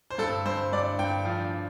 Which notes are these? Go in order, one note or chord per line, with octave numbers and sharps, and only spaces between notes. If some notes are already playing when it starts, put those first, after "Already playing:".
C5
G2 A4
G2 C5
G2 D5
G2 G5
F3